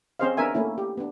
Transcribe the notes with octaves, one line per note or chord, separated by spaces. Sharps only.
C4 C#4 G#4 C5 D#5 F5
B3 D4 A#4 E5 G#5
A3 A#3 C#4 E4
G4
B3 D4